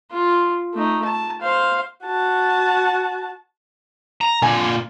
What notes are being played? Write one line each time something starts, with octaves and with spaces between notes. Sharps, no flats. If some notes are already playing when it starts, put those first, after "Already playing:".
F4
A3 D#4
A5
C5 F5
F#4 A5
A#5
A#2 D3 G#5